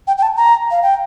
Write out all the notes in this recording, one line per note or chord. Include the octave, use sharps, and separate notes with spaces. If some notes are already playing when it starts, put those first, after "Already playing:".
G5
G5
A5
A#5
F5
G5